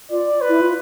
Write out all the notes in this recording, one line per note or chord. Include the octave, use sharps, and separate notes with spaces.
F4 D5
B4
E4
F4